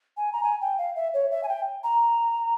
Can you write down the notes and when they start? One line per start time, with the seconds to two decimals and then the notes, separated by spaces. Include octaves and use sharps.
0.17 G#5
0.33 A#5
0.43 G#5
0.61 G5
0.78 F5
0.96 E5
1.14 C#5
1.31 E5
1.43 G#5
1.48 G5
1.84 A#5